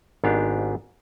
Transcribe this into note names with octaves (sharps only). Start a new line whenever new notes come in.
G#1 G#2 B3 D4 G4 F5